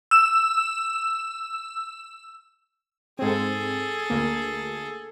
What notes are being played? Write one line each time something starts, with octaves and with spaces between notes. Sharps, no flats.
E6 E7
G#2 C4 G#4 A4
D2 A#3